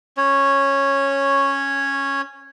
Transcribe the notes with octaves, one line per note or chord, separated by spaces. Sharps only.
C#4 C#5